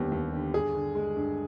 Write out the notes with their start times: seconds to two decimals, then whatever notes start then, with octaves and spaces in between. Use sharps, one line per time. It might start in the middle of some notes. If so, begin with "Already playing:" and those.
Already playing: D#2 D3 G3 B3 G4
0.12 D#2
0.33 D3
0.54 G2 G#4
0.74 D3
0.95 G#3
1.16 G2